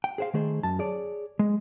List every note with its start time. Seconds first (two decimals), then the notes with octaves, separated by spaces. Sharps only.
0.04 G5
0.18 G#4 C5 F5
0.34 D#3 A3 G#4 C5
0.63 F#2 A5
0.79 G#4 C#5 D5
1.39 G#3